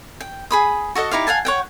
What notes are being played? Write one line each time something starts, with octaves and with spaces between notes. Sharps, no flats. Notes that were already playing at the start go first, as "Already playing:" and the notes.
G5
G#4 B5 D#6
F#4 A4 D#5 F#5
D#4 E4 G4 F5
F5 F#5 G#5 A5
C#5 F#5 G5